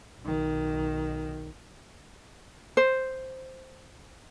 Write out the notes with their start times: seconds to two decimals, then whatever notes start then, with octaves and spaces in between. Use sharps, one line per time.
0.21 B1 D#3
2.77 C5